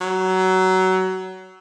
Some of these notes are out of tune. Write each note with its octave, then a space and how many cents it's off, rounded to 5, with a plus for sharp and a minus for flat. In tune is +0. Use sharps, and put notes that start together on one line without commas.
F#3 +20